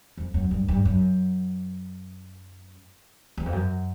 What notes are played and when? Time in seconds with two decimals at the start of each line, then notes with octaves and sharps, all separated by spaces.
0.17 F2
0.34 F#2
0.51 G2
0.68 G2
0.85 F#2
3.37 E2
3.46 F2
3.53 F#2